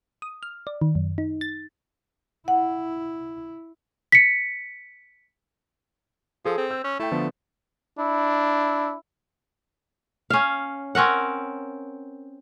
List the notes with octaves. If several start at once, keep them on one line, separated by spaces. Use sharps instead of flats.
D#6
F6
D5
D#3
F#2
D#4
A6
E4 F#5
B6 C#7
F3 G#4 A4
C4
E6 G6
C#4
A3 E4 G5
D3 F3 B3
D4 E4
C#4 F5
C4 C#4 A#4 F#5